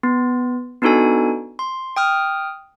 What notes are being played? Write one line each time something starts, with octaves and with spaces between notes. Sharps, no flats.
B3
B3 D4 D#4 F#4 A4 G#5
C6
G5 D#6 F6